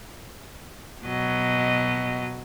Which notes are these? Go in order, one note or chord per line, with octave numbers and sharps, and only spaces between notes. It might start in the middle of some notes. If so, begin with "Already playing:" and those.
B2 F#3 D#5